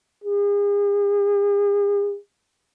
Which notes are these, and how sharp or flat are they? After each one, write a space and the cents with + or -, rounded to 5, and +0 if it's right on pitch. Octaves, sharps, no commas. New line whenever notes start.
G#4 -40